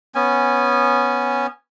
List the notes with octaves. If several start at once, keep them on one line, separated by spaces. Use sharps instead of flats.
B3 C#4 G#5